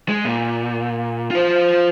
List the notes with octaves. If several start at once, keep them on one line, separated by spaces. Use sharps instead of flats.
G#3
A#2
F4 C5